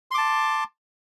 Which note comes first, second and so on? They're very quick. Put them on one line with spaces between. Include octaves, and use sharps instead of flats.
C6 D6 A5